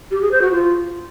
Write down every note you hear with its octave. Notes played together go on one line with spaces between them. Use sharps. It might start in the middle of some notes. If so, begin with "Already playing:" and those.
G4
G#4
C5
F#4
F4